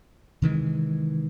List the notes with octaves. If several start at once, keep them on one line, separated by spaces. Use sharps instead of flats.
C3 D#3 E3 G#3